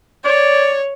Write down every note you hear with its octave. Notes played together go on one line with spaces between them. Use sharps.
C#5 D5